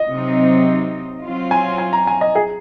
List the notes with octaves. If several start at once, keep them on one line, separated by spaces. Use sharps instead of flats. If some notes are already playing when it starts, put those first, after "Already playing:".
Already playing: D#5
C3 F#3 C4 D#4
F#3 C4 F4
G#5
G#5
A#5
G#5
D#5
G#4